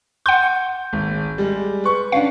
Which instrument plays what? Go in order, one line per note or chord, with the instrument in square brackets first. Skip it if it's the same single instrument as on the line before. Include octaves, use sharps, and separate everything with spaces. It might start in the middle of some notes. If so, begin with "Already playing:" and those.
[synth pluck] F#5 C6 [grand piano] G6
[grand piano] G#1
G3 G#3
B4 C#6
[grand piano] C#4 D4 [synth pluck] F5